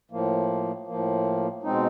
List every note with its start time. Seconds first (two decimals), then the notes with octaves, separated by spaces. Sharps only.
0.11 A2 F3 A#3
0.87 A2 F3 A#3
1.63 B2 G#3 C4 D#4